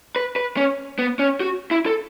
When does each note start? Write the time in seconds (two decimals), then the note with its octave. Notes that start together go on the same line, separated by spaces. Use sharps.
0.16 B4
0.36 B4
0.57 C#4
0.99 B3
1.19 C#4
1.40 F#4
1.71 E4
1.86 A4